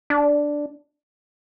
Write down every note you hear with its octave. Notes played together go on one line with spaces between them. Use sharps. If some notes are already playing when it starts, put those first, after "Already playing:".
D4